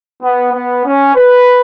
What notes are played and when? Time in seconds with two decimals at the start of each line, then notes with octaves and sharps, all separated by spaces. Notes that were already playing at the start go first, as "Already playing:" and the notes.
0.23 B3
0.54 B3
0.85 C#4
1.15 B4